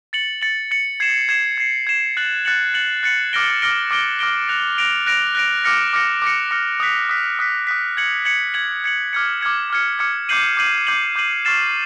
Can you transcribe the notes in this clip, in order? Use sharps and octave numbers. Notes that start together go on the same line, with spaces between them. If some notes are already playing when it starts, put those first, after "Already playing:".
A6 C#7 F#7
A6 C#7 F#7
A6 C#7 F#7
G#6 C7 E7
G#6 C7 E7
G#6 C7 E7
G#6 C7 E7
F#6 A6 C#7 F#7
F#6 A6 C#7 F#7
F#6 A6 C#7 F#7
F#6 A6 C#7 F#7
D6 F6 A#6 D7 G7
D6 F6 A#6 D7 G7
D6 F6 A#6 D7 G7
D6 F6 A#6 D7 G7
F#6 A#6 D7 F7
F#6 A#6 D7 F7
F#6 A#6 D7 F7
F#6 A#6 D7 F7
D6 F6 A#6 C#7
D6 F6 A#6 C#7
D6 F6 A#6 C#7
D6 F6 A#6 C#7
D#6 F#6 B6
D#6 F#6 B6
D#6 F#6 B6
D#6 F#6 B6
G#6 C#7 F#7
G#6 C#7 F#7
G#6 C#7 F#7
G#6 C#7 F#7
D6 F6 G#6 C#7
D6 F6 G#6 C#7
D6 F6 G#6 C#7
D6 F6 G#6 C#7
D6 G6 C7 D#7 F#7
D6 G6 C7 D#7 F#7
D6 G6 C7 D#7 F#7
D6 G6 C7 D#7 F#7
C#6 F6 A6 C7 E7